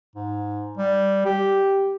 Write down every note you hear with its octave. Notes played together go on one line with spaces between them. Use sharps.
G#2
G3
G4